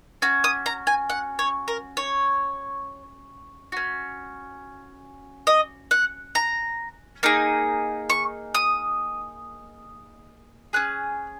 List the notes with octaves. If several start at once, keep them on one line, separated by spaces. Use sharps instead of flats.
C#4 F#4
D#6
A#5
G#5
F#5
C#5
A#4
C#5
C#4 F#4
D#5
F#5
A#5
A#3 D#4 G#4
C#6
D#6
C#4 G#4 F#6